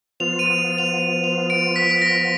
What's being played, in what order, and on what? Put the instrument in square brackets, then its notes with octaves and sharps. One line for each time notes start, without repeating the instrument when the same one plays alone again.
[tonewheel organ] F3 B3 F4 [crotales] F7
[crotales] D#7
D#7
F7
F7
D7
B6
B6
A#6